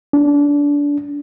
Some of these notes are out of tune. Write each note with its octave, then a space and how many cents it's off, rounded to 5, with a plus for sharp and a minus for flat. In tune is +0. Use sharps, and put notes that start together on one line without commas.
D4 -25